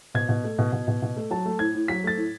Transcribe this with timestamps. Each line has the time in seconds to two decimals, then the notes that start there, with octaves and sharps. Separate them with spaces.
0.15 B2 G#6
0.29 B2
0.44 A3
0.59 B2
0.73 B2
0.88 B2
1.02 B2
1.17 A3
1.31 F#3 A5
1.45 A3
1.59 A2 G#6
1.75 A2
1.88 F#3 B6
2.04 A3 A6
2.17 A2